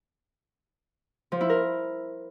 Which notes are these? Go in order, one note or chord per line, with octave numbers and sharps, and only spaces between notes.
F3
E4
A#4